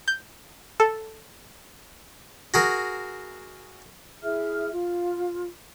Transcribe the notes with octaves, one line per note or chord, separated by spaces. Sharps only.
G6
A4
F#4 G#4 A#4
E4 G#4 E5 F6
F4